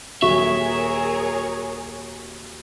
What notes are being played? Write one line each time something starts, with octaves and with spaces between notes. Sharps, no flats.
D#1 F#3 F#4 G#4 A#4 C#5 E5 C#6